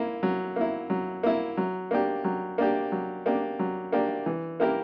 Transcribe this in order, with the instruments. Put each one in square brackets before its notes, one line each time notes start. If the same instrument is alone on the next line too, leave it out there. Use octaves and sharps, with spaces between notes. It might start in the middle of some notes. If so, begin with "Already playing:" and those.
Already playing: [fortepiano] A#3 E4
F#3
A#3 E4
F#3
A#3 E4
F#3
A#3 D4 G4
F#3
A#3 D4 G4
F#3
A#3 D4 G4
F#3
A#3 D4 G4
E3
A#3 E4 G4 A#4